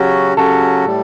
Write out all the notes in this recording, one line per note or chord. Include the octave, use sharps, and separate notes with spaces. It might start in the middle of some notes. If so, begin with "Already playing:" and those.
Already playing: C#3 F#3 C#4 F#4 G4
C#3 F#3 C#4 F#4 A4
A2 G3